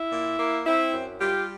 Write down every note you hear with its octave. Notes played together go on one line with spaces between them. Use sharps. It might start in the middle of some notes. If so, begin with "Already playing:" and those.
Already playing: E4
A#2
A#3
C4 E4
F#2
G3 F4 G4